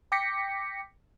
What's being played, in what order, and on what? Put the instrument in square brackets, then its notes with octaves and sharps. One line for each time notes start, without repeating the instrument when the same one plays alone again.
[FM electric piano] G5 D6 G6 A#6 B6 C#7